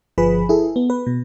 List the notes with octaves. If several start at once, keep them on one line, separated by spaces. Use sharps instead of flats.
G1 F3 G#4 B4 B5
E4 G#4 A4
B3
B4
B2